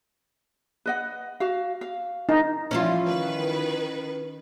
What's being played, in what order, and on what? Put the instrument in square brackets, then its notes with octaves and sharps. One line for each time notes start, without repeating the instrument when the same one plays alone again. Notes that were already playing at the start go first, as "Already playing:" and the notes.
[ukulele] B4 D#5 F#5
F#4 F5
F5
[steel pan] D#4
[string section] E3 F3 G3 [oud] C#4 E4 F4
[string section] D#3 B4